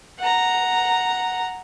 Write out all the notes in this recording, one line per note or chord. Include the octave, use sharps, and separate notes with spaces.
F#5 A#5